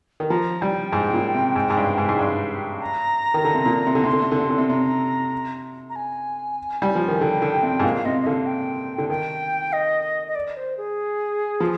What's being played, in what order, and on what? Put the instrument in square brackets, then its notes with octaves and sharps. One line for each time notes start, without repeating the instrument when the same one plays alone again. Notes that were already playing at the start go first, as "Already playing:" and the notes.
[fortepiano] D#3
[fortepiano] F3 [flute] A#5
[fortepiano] G3 [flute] G5
[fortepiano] G#2
A#2
C3
G#2
G#2
G2
G#2
G#2
[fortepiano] G2 [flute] G5
[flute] A#5
[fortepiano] D#3
D3
C3
A#2
C3
D3
[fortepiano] C3 [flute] C6
[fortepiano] D3
C3
D3
C3
D3
C3
[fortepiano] C3 [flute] A#5
[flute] A#5
G#5
[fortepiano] G3
F3
D#3
[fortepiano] D3 [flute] G5
[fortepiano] D3
C3
G#2
[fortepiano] A#2 [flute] F5
[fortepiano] C3 [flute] D#5
[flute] D#5
[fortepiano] D3 [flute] F5
[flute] G5
[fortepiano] D3
[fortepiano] D#3 [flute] G5
[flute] D#5
D#5
D5
C5
G#4
[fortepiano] F3